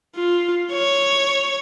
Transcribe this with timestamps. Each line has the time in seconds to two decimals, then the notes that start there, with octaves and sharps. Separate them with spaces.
0.16 F4
0.73 C#5